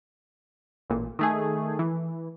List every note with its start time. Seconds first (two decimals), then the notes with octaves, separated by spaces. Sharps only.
0.90 A1 A#2
1.19 D#3 A3 G#4
1.79 E3